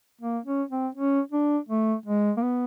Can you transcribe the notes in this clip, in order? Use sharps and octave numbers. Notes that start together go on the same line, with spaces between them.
A#3
C#4
C4
C#4
D4
A3
G#3
A#3
B3